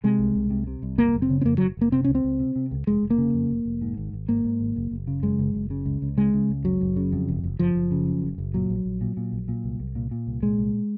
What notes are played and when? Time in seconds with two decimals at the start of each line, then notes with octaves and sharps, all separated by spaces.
0.04 C3 G#3
0.19 C2
0.35 C2
0.50 C3
0.67 C3
0.83 C2
0.98 F#1 A#3
1.14 F#1
1.22 C4
1.30 C#3
1.41 C4
1.45 F2 A#3
1.58 F#1 F#3
1.77 F#1 A#3
1.92 C3 C4
2.04 C#2 C#4
2.15 C4
2.24 C#2
2.40 C3
2.56 C3
2.71 C#2
2.87 F1 G#3
3.03 F1
3.10 A#3
3.18 C#3
3.34 F2
3.50 F1
3.65 F1
3.81 G#2
3.98 G#1
4.13 G#1
4.29 G#2 A#3
4.45 G#2
4.60 G#1
4.76 F#1
4.91 F#1
5.07 C#3
5.23 F#2 G#3
5.39 F#1
5.55 F#1
5.70 C#3
5.86 C#2
6.02 C#2
6.17 C#3 G#3
6.34 C#3
6.50 C#2
6.64 F#1 F#3
6.81 F#1
6.96 C#3
7.12 F2
7.28 F#1
7.44 F#1
7.59 F#1 F3
7.75 F#1
7.91 C#3
8.06 F#2
8.22 F#1
8.38 F#1
8.54 A#2 F#3
8.70 A#1
8.85 A#1
9.01 A#2
9.17 A#2
9.32 A#1
9.48 A#2
9.64 C2
9.80 C2
9.95 A#2
10.11 A#2
10.27 C2
10.43 A#2 G#3
10.58 C2